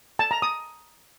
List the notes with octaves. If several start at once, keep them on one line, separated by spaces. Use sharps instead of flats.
A5
A#5
D#6